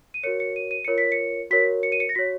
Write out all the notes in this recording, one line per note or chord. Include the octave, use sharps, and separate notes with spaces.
D#7
F#4 A#4 C#5 C#7
C#7
D#7
D#7
F4 A#4 C#5 C#7
B6
C#7
F#4 A#4 C#5 B6
C#7
D#7
C#7
A#6
F#4 C#5 B6